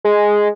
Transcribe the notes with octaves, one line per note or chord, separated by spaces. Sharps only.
G#3